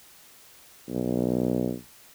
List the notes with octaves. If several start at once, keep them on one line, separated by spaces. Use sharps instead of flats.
B1